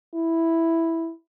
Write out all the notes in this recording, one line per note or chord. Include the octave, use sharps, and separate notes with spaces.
E4